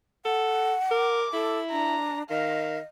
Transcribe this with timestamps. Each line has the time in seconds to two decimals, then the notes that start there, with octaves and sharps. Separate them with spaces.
0.25 A4 F#5
0.91 A#4 D6
1.33 E4 A4
1.71 D4 A#5
2.30 D#3 D#5 F5